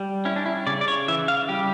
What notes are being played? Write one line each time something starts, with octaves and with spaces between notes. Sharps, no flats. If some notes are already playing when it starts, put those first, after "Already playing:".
Already playing: G3
C#4 E4
D4
E4
C#3 D5
D5
C#5
E3 E5
F5
G3 G4